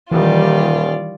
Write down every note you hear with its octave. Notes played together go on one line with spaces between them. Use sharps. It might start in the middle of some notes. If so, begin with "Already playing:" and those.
D#1 D#3 E3 G3 F4 D5